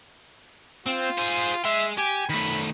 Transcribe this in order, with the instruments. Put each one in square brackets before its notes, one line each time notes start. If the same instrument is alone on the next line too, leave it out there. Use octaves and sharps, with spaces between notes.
[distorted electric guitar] C4 [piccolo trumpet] F4
[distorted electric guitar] G#4 C5
[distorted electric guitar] G#3 C6 [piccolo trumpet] E5
[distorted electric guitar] G4 [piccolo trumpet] G#5
[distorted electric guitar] D#3 A3 [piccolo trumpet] B5